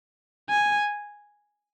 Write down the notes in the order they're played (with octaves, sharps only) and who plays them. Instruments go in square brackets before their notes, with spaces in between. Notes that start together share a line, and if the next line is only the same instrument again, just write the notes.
[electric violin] G#5